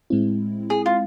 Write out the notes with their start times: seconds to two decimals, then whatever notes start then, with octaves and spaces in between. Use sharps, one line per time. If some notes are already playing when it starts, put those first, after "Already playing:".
0.10 A2 G#3 C4 E4
0.70 G#4
0.86 F4